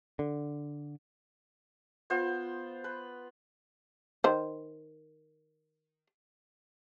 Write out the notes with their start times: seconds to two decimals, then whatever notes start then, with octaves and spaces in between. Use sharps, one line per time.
0.19 D3
2.10 B3 F4 C5
2.84 B4
4.24 D#3 C5